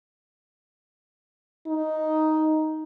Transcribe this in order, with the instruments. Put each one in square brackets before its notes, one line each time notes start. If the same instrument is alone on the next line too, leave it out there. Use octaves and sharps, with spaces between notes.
[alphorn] D#4